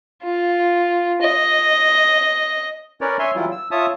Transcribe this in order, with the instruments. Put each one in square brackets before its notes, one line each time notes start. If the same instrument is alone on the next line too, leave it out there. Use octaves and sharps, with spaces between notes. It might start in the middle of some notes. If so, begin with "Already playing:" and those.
[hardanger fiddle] F4
D#5
[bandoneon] C#4 A#4 B4 C#5 D5
C#5 E5 G#5 C6
E3 F#3 G3 E4 F4
E6
F4 C#5 E5 A5 D#6